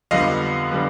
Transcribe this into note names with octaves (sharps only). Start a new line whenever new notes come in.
F2 D3 G3 B3 D#5 F5
D3 G3 B3